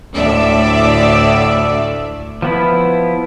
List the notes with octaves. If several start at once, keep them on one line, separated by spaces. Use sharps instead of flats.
D2 A2 D5 E5
F3 B3 E4